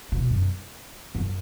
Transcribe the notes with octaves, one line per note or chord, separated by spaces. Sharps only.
B2
F#2
F#2